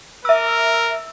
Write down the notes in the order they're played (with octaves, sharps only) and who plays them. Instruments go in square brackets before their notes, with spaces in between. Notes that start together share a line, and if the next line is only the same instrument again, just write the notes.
[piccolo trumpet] A#4 [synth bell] E5 E6